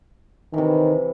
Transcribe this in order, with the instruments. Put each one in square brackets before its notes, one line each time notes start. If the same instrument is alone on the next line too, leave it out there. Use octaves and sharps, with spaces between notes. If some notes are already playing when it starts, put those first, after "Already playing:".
[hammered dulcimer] C3 E3 [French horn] D#3